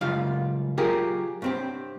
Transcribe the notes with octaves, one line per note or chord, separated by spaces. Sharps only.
C#2 F#2 G3 F4 F5
F#3 F4 G4 G#4 A#4
G2 C4 G4